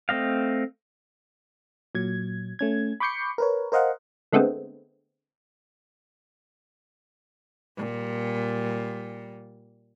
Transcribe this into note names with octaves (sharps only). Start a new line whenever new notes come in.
A3 C4 D#5 F5
A#2 F#3 G#6
A3 C#4 G#6
B5 C#6 D6 G6 C7 C#7
A#4 B4 C#5
A#4 C5 D#5 F5 F#5
D3 G#3 A3 B3 C4
A#2 G3